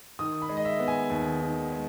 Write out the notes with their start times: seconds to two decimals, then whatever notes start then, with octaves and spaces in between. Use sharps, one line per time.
0.19 D#3 D#6
0.42 B5
0.49 G#3
0.57 D#5
0.65 E5
0.80 B3
0.88 G#5
1.10 D#2
1.41 D#3
1.72 G#3